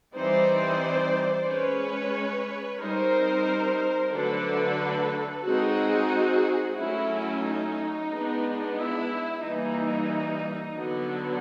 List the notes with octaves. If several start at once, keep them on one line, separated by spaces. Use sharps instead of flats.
E3 G3 C4 D#4 C5 D5
G#3 C#4 B4 C#5
G3 C4 D#4 A#4 C5
D3 F#3 A3 D4 A4 B4
G#3 C4 D#4 F#4 G#4
F#3 A3 C#4 E4
D#4
G#3 B3 D4
E4
E3 G3 A#3 D#4
D3 F#3 B3